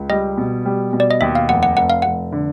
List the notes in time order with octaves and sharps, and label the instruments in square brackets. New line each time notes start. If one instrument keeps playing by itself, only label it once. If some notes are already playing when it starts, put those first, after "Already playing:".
Already playing: [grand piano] C#2
[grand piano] G3 [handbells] D#5
[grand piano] B2
G3
B2
[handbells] D5
D#5
[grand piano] D#2 [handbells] E5
[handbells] F5
[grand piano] F1 [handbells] F#5
[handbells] F#5
[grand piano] F1 [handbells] F#5
[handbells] F5
[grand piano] F1 [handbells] F#5
[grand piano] D3